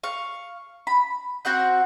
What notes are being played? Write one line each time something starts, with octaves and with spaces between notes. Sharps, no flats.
F5 C#6
B5
C4 F#4 F#5 G6